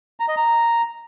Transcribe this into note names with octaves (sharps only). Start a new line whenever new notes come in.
A#5
D#5
A#5